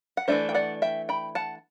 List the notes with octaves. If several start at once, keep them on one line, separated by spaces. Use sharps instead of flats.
F#5
E3 A3 D4 C5 E5
G5
D5 F#5
E5 G5
G5 B5
F#5 A5